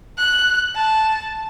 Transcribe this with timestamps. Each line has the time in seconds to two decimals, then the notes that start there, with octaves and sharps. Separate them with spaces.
0.18 F#6
0.75 A5